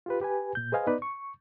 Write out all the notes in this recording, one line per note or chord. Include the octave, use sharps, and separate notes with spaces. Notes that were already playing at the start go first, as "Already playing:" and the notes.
F4 G4 B4
G4 B4 G#5
A#2 G6
G#4 B4 C5 D#5 F5 G#5
B3 D#4 B4 D5
C#6